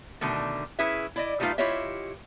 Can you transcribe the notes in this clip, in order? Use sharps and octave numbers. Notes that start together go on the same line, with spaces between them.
B2 D3 D#3 A3
C#4 E4 G#4 B4 E5
E4 D5 D#5
G3 A3 D#4 F4 B4 F5
E4 F4 G4 C#5 D#5 E5